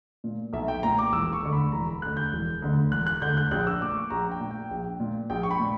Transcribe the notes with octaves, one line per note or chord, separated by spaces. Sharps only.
A#2
B1 E5
G5
A#2 A#5
D6
E1 E6
C#6
D2 D3
B5
E1 A#5
B5
D2 D3 F#6
G6
E1
D2 D3
E1 F#6
F#6
D2 D3 G6
F#6
A#1 F#6
E6
A#2 D6
C#6
A#1 A#5
G5
A#2
G5
A#1
A#2
A#1 G5
C#6
B5
A#2